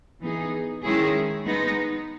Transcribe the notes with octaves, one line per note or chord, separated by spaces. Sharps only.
E3 B3 D#4 G#4
D#3 G#3 C#4 E4 G#4
G#3 B3 D#4